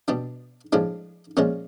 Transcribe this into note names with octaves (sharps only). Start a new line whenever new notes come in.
B2 G3 D4
A2 F3 G#3 D4
A#2 F3 G#3 C#4